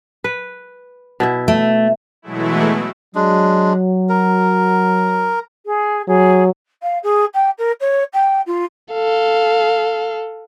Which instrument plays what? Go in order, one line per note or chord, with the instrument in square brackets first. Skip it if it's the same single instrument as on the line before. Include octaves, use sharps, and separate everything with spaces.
[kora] B4
B2 E4 E5
[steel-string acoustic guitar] A3
[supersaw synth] B2 E3 F#3 G#3 A3 E4
[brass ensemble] F#3 [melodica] G#3 D4
[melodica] A#4
[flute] G#4
[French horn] F#3 [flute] G#4
[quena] F5
G#4
G5
A#4
C#5
G5
F4
[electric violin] A4 F5